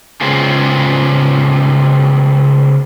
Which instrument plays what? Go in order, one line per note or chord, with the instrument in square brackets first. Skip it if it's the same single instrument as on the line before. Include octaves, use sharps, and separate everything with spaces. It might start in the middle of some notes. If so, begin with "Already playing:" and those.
[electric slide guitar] C#3 G#3 B3 C4 F4 G#4